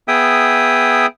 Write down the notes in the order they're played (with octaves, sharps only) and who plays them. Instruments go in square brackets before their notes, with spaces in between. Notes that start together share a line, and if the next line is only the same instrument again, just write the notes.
[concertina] B3 G#4 E5 G5 D#6